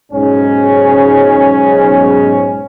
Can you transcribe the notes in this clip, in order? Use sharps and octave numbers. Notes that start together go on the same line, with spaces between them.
B1 G#2 C#4